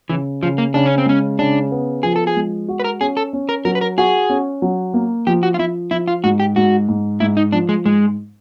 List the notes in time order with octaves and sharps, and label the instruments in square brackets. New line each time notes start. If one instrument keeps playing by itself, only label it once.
[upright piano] C#3 [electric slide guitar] E3
[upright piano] C#3 [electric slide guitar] F3
[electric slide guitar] A#3
[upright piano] C#3 [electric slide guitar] D4
[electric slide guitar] C#4
C4
[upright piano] G#3 [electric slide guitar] C#4
[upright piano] C#3 [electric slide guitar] D4
[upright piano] B3
[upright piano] F3 [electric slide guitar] G#4
[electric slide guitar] A4
G#4
[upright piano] G#3
F#4
[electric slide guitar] B4
A#4
[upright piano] C#4 [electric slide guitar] G#4
[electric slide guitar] A4
[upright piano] C#4
[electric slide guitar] A#4
[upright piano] F#3 [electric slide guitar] A#4
[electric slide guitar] B4
A#4
[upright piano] F#4 [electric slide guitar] G#4
[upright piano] C#4
F#3
A#3
[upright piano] F3 [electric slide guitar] G4
[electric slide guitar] F#4
F4
[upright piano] F3 [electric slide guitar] E4
[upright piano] F3 [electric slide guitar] E4
[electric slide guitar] F4
[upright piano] G#2 [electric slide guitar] F#4
[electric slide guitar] G4
[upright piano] G#2 [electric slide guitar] F#4
[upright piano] G#2
[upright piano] G#2 [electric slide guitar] E4
[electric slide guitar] D#4
[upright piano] F3 [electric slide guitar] D4
[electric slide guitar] G#3
[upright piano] G#2 [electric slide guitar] G#3